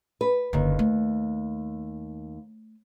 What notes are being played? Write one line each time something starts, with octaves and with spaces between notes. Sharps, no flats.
B4
F#1 D#2 D3
A3